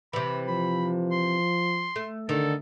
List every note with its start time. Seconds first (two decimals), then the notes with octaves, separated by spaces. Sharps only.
0.13 C3 E3 B5
0.48 F3 B5
1.12 C6
1.96 A3
2.29 D3 D#3 A4